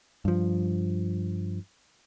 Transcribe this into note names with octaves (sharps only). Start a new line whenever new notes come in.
G2 F3